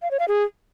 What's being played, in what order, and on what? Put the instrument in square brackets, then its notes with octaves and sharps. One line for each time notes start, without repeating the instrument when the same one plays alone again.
[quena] F5
C#5
F5
G#4